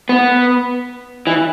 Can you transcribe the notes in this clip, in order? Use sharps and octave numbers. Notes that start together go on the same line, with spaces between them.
B3
E3